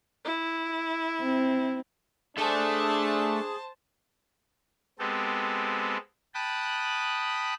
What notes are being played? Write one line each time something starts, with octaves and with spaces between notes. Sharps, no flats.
E4
C4
A3 D4 G#4 A4 C5 A5
G#3 B3 C4 G4 A4
G5 A5 B5 D#6 F#6